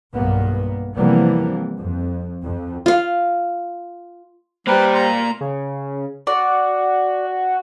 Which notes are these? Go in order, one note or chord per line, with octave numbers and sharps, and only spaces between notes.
B1 G2 A#3 B3
C3 E3 F3 G3 A#3 B3
F2
F2
F4 F5
G3 A#3 G4 B4 C5 D5 A#5
A#5 C6
C#3
F#4 D5